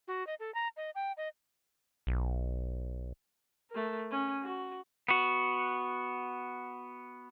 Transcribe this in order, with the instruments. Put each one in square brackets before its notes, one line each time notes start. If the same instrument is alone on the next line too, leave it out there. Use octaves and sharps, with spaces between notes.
[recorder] F#4
D#5
A4
A#5
D#5
G5
D#5
[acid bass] B1
[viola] A3 A#4
C#4
F#4
[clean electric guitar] B3 F#4